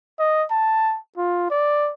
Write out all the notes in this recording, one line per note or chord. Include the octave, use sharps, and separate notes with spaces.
D#5
A5
F4
D5